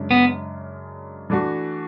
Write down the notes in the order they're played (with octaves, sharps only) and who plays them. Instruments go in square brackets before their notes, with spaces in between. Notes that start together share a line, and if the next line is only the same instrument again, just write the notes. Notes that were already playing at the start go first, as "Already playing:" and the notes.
Already playing: [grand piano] F#2 C#3 G#3 D4
[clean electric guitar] B3
[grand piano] E3 A3 D4 F#4